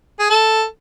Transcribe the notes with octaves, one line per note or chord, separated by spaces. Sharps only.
G#4
A4